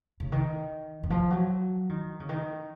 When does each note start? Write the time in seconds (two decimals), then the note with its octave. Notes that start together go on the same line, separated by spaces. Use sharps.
0.20 C#3
0.32 D#3
1.03 D#3
1.10 F3
1.31 F#3
1.89 D#3
2.20 C#3
2.29 D#3